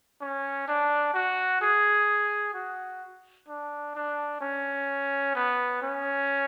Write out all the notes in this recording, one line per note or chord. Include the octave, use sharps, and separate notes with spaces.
C#4
D4
F#4
G#4
F#4
D4
D4
C#4
B3
C#4